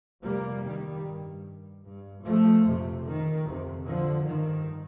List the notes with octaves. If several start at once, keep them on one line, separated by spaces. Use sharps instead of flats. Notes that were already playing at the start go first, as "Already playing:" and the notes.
F2 C3 G3 A#3
D#3 G3
G2
G2
F3 A3
F2 C3
D#3
F2 C3
D3 F3
G2 D#3